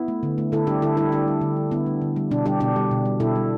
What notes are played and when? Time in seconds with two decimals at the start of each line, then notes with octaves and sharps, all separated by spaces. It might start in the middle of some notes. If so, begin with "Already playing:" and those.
Already playing: B3 E4
0.08 A3
0.23 D3
0.38 A3
0.52 D3 E4 A4
0.67 G3 D4 G4
0.82 D3 E4 A4
0.97 G3 E4 A4
1.12 D3 D4 G4
1.28 G3
1.41 D3
1.56 G3
1.71 D3 B3 E4
1.86 G3
2.02 D3
2.16 G3
2.31 B2 D4
2.46 G3 D4 G4
2.60 B2 D4 G4
2.76 G3
2.91 B2
3.06 G3
3.20 B2 E4 A4
3.36 G3